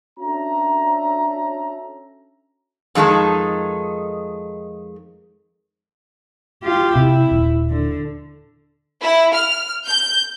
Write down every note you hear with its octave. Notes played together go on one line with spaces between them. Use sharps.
C#4 D4 F#4 A4 E5 A#5
F2 D#3 G#3 D#4 A4
F4 G4
C3 E4
D#1
D3
E4
F6
G6